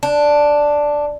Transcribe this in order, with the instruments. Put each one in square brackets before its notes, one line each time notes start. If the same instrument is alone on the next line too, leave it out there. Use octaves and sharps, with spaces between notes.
[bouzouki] D4